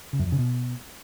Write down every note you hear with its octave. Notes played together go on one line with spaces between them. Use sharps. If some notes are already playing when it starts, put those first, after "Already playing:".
C#3
F#2
F2
C#3
B2